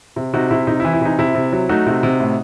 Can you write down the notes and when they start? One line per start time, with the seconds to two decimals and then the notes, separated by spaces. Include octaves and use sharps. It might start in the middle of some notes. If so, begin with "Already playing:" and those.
0.16 C3
0.33 C3 D#4 F#4
0.50 C3 E4
0.67 C3 D#4
0.80 E4
0.85 E3
0.93 E4
1.01 C3 D#4
1.19 C3 E4
1.35 C3
1.53 F#3
1.69 A3 D#4 F#4
1.87 C3
2.03 C3
2.20 A2